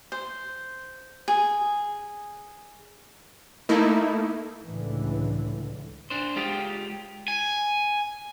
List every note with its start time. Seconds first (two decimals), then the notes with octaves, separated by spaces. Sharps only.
0.12 C5
1.28 G#4
3.69 A3 A#3 D#4 E4
4.65 C#2 A2 D3 E3
6.10 D4 C5
6.36 G#3 F4 G4
7.28 G#5